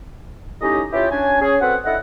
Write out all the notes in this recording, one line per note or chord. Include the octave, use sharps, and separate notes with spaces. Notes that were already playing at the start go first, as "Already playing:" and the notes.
A2 C#4 D#4 G4 D#5 A#5
C#4 E4 F4 G4
C#4 D4 G#5
C#4 G#4
C4 F#4 A4 B4 F#5
D3 E4 A4 D#5 F#5